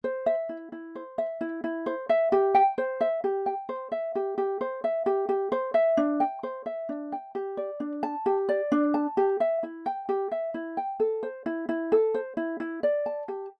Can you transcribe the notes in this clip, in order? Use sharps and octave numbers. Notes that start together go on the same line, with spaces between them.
C5
E5
E4
E4
C5
E5
E4
E4
C5
E5
G4
G5
C5
E5
G4
G5
C5
E5
G4
G4
C5
E5
G4
G4
C5
E5
D4
G5
C5
E5
D4
G5
G4
D5
D4
A5
G4
D5
D4
A5
G4
E5
E4
G5
G4
E5
E4
G5
A4
C5
E4
E4
A4
C5
E4
E4
D5
A5
G4